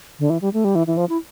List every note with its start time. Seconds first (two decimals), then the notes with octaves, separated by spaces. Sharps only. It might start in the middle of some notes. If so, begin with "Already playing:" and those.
0.19 D3
0.30 E3
0.41 G3
0.53 A3
0.64 G3
0.75 E3
0.87 E3
0.97 F3
1.09 E4